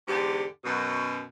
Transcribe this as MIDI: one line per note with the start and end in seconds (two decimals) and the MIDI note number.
0.08 0.43 40
0.08 0.43 44
0.08 0.43 50
0.08 0.43 67
0.64 1.23 42
0.64 1.23 47